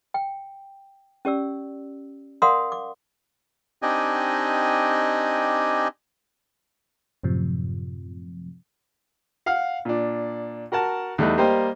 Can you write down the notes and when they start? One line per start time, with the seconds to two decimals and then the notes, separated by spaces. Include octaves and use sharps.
0.14 G5
1.25 C#4 G4 D5 E6
2.42 A#4 D5 F5 F#5 C6 D#6
2.72 D6
3.82 C4 D4 D#4 G4 D#5 G#5
7.23 F#2 A2 C3 F3
9.46 F5 F#5 F6
9.85 A#2 D4
10.72 F#4 A#4 F#5 A5
11.18 E2 G3 A3 D#4 F#6
11.38 G3 A#3 G4 C5 D#5